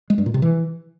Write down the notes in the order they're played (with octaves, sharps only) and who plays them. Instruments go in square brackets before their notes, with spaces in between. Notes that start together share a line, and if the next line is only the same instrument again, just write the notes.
[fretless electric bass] G#3
G2
A#2
C3
E3